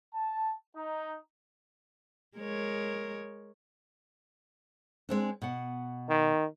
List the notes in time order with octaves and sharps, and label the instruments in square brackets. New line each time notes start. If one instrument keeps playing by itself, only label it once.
[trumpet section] A5
D#4
[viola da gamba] G#3 A#4 C#5
[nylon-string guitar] G#3 C4 D4
B2 F#5
[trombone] D#3